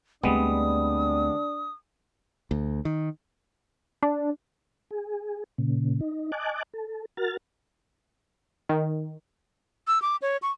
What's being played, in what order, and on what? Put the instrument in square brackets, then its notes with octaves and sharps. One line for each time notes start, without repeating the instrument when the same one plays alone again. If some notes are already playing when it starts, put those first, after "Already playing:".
[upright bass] D2 C4 [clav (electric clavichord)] G3 G#3 B3 [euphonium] D4 [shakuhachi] D#6
[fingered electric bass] D2
D#3
[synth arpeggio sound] D4
[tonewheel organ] G#4
A#2 C#3
D#4
D#5 G#5 A5 D6 F#6
A4
F#4 A#4 F6 A6
[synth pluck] D#3
[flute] E6
D6
C#5
C#6